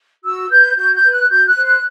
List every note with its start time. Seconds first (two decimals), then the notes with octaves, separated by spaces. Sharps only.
0.23 F#4 E6
0.50 B4 G6
0.76 F#4 G6
0.94 G6
1.03 B4
1.11 F#6
1.29 F#4 G6
1.46 F#6
1.55 C5
1.64 F#6